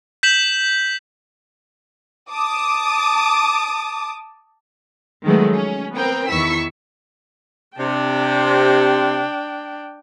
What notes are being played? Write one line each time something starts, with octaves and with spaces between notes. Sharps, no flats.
G6 B6 E7 F#7
A5 D6 D#6
D#3 F3 F#3 G#3 A3 B3
C#4
B3 C4 A#4 G5
E2 D#3 E4 C#6 E6 B6
C3 D4 G5